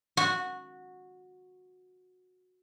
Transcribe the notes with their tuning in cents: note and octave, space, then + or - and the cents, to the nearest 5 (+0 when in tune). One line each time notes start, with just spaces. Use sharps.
F#4 -15